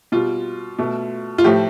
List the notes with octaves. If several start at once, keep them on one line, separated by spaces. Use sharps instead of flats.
B2 G3 F4
B2 A3
F4
A2 F3 A3 G4